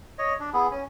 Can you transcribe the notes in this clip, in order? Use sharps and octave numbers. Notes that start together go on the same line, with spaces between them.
C#5 D#5
D4
B3 E4 G#4
C#4